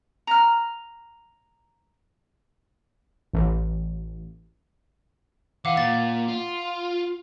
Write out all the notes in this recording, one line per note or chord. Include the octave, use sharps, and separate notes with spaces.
A#5 F6
A1
E3 F5 F#5 D6
A#2 A6
F4